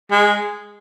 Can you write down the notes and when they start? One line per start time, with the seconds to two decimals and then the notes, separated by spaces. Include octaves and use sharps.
0.11 G#3